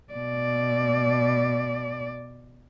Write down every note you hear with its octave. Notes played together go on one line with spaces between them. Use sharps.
B2 D5